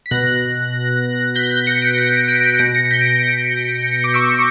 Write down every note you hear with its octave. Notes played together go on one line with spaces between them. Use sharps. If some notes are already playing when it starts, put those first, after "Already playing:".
B6
B2 F#6 A#6
G6 B6
G6 B6
A#6 C#7
B6 D7
A#6 C#7
B6 D7
B2 A#6 C#7
A#6 C#7
G6 B6
D7
A#6 C#7
A#6 C#7
D6
C#6 E6